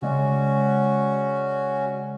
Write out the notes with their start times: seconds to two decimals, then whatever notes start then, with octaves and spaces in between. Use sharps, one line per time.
0.02 C#3 G#3 C#4 F#4 D5